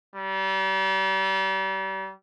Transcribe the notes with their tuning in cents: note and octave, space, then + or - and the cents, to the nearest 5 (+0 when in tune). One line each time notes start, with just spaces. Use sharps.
G3 -35